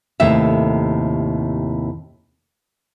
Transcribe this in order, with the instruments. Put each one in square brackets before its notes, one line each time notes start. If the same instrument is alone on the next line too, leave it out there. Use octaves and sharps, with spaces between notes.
[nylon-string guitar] D#2 A2 C3 E5